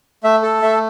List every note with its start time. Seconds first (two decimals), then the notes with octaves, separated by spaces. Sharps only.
0.24 A3 E5
0.42 A4
0.62 A3 E5